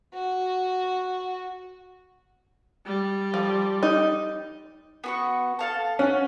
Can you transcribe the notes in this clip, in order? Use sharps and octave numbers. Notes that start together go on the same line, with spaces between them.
F#4
G3
F3
D#4
B3 F#4 C#6
A4 F5 A5
C#4 F#5